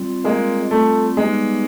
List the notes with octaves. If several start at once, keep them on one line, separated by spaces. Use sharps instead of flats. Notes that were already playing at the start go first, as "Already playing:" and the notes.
Already playing: G3 C4 F4
G#3 A#3
A3
G3 G#3 B3 D#4 G4 B4